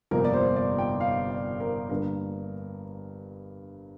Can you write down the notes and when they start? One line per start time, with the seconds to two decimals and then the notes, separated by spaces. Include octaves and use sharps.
0.11 G1 F2 C3 A#3 A#4
0.25 D5
0.33 C5
0.56 D5
0.78 G5
1.00 F5
1.30 D5
1.60 A#4
1.89 G2 D3 A#3 A#4